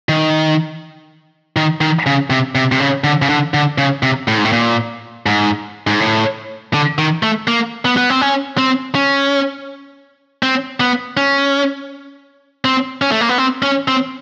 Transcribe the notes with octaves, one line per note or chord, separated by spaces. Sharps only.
D#3
D#3
D#3
C#3
C3
C3
C3
C#3
D3
C#3
D3
D3
C#3
C3
A2
G#2
A2
A#2
G#2
G#2
A2
D3
D#3
A3
A#3
B3
B3
C4
C#4
C4
C#4
C4
B3
C#4
C4
C#4
A3
A#3
B3
C4
C#4
C4